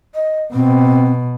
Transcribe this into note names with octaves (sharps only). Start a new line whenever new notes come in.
D#5
B2 C4